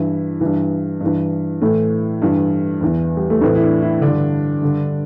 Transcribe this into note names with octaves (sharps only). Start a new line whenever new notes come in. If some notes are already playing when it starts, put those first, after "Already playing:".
Already playing: G2 E3 E4
G2 E3
G2 E3
A2 E3 A3
G2 E3
E2 E3
G3
A3
A2 E3 C4
E4
D4
E4
G2 D3 D4
G2 D3